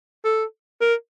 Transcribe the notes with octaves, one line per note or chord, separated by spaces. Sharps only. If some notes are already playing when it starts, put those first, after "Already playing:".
A4
A#4